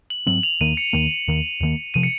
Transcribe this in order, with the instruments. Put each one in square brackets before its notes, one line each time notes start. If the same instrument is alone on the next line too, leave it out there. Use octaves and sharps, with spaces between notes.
[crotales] F#7
[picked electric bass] G#2 F#3 C4 [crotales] F#7
[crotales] F7
[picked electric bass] D#2 D#3 A#3 [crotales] D#7
[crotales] C#7
[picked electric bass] D#2 D#3 A#3
D#2 D#3 A#3
D#2 D#3 A#3
[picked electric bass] C3 F3 [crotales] D#7
[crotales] C#7